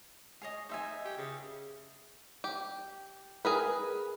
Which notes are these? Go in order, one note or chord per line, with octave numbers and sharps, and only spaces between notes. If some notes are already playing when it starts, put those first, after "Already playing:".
G#4 C#5 D#5
D#4 C5 E5 G#5
G4
C#3
G4
G#4 A#4 B4